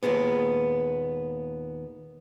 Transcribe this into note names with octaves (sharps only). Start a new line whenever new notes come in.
D#2 A#2 G#3 B3